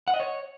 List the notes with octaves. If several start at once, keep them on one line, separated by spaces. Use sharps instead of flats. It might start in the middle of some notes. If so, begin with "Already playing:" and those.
F#5
D#5
C#5